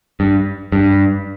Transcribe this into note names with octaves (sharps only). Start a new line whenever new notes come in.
G2
G2